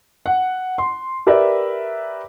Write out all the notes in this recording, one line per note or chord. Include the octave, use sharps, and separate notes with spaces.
F#5
C6
G4 A#4 B4 D5 E5